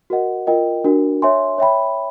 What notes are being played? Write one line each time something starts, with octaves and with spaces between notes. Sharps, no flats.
F#4 A#4 D#5 F#5
F4 A#4 D#5 G5
D4 F#4 A#4
C#5 E5 G#5 C6
C#5 E5 G5 B5